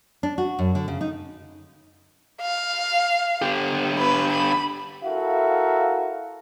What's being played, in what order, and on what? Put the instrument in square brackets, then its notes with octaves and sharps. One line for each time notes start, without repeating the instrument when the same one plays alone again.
[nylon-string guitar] D4
F#4
F#2
D3
C#3
D#4
[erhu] F5
[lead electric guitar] D3 G4
[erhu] B4
B5
[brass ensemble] E4 F#4 A4 A#4 E5 F5